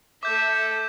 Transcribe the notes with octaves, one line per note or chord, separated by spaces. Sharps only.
A3 E5 D6 G6